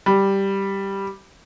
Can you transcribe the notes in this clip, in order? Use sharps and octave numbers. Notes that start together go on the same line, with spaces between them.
G3